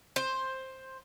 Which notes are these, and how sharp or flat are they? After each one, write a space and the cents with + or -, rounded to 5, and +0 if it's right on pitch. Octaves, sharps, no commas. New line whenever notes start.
C5 +10